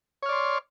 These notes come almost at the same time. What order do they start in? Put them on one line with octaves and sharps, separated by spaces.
C#5 F6 D5 C6